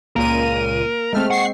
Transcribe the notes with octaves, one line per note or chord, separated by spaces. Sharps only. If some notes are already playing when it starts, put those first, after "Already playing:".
C#2 A#2 A#3 A#4 D#7
G#3 A3 C4 F6
F#5 C#6 C7